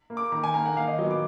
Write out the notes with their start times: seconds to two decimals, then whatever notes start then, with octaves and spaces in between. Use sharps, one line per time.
0.10 A#3
0.17 D6
0.32 D#3 A#5
0.44 G#5
0.54 A#3 A#5
0.65 F#5
0.77 D#3 F5
0.88 D#5
0.99 F#3 D#5
1.04 B3
1.11 D6